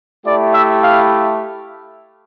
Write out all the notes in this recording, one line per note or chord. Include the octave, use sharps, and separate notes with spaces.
A3 E4 G4 D5
E5
F5